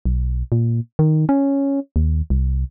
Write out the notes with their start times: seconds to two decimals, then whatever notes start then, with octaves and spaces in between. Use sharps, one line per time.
0.05 B1
0.52 A#2
0.99 D#3
1.29 C#4
1.96 D#2
2.30 C2